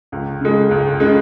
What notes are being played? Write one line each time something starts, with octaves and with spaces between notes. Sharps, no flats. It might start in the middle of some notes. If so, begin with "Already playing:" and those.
C#2
C#3 G#3
C#2
C#3 G#3